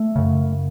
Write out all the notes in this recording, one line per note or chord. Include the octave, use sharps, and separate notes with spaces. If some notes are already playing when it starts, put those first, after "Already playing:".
Already playing: A3
F#2 C#3